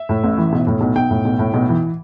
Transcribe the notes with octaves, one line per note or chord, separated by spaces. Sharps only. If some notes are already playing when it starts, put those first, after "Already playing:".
Already playing: E5
A2
A1
E3
B1
A2
B1
B1 G5
A2
B1
A2
B1
E3